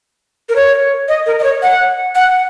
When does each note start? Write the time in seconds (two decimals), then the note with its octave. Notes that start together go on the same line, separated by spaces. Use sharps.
0.49 A#4
0.56 C#5
1.08 D#5
1.26 A#4
1.39 D#5
1.44 C#5
1.62 F#5
2.15 F#5